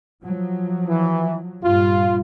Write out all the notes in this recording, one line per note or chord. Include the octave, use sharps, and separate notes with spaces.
F3 F#3
E3
G2 A#2 G3 F4